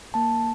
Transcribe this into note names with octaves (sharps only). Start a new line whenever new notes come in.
A#3 A5